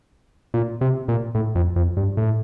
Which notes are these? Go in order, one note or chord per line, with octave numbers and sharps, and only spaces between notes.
A#2
C3
A#2
A2
F2
F2
G2
A2